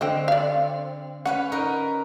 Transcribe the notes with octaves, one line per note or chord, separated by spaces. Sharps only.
D3 C4 D#5 G5
D5 F5
C#4 B4 C#5 F#5
D#4 A#4 B4